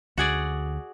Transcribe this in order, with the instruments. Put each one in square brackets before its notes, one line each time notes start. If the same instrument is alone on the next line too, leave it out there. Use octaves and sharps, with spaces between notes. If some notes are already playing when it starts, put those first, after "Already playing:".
[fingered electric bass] D2 [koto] F#4 G#4 D5